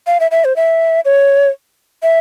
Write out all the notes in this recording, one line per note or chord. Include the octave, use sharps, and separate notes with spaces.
F5
E5
E5
C5
E5
C#5
E5